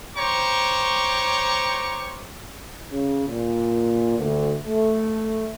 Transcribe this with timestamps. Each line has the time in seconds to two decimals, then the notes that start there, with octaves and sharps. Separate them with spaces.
0.16 C5 C#5 G5 A#5 C#6 D6
2.92 C#3
3.27 A#2
4.18 D2
4.67 A3